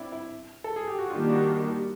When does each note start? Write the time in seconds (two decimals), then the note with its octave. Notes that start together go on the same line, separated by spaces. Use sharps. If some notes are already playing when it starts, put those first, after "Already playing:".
Already playing: C4 D4 E4
0.12 E4
0.64 A4
0.76 G#4
0.88 G4
0.99 F#4
1.10 D#3 G3 A#3 D4 F4 G4
1.29 F#4